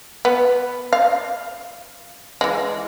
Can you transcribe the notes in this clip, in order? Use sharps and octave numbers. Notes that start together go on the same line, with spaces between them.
B3
F5
E3 G#3